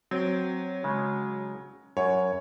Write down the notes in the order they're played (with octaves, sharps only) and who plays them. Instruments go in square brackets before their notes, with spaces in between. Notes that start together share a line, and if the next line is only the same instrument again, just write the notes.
[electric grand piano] F#3 [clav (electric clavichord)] C4 G5
[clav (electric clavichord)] C#3 G#3
[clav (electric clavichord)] F#2 [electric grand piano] C#5